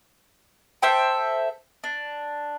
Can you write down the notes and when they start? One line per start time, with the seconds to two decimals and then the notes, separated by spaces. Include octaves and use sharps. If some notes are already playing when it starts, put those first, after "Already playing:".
0.82 A4 C5 E5 G5
1.84 D4